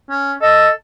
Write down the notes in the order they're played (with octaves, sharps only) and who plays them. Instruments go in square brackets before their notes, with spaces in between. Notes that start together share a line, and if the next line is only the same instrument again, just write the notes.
[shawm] C#4
[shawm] A4 [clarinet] D#5